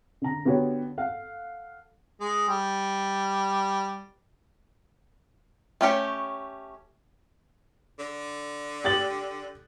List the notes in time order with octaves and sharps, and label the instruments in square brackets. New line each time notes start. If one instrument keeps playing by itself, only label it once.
[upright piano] D3 A#5
D3 B3 F#4 G4 C#5
A4 F5 F#5
[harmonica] G#3
G3
[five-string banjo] A3 C#4 G4 C#5
[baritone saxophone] D3
[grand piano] G4 A6 F#7